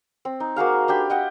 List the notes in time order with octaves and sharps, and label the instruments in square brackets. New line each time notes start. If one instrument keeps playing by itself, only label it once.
[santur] C4
D#4
A#3 F#4 G#4 F5
D4 G4 G5 B5
D#5 F#5 G5